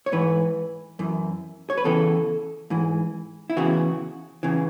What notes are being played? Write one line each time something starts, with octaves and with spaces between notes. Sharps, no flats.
C#5
G#2 E3 B4
F#2 E3
C#5
B4
E2 C#3 E3 A4
G#2 E3
E4
E2 C#3 E3 F#4
C#3 E3